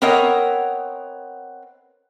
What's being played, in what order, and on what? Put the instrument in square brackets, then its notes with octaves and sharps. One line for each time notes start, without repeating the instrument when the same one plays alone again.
[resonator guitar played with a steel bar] B3 C4 A#4 C#5 D#5 F#5